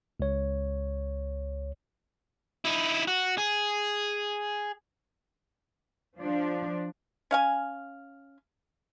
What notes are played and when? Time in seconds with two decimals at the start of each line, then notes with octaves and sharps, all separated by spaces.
0.20 C#2 C#5
2.65 D#4 E4
3.08 F#4
3.38 G#4
6.20 F3 D4
7.31 C#4 F5 G#5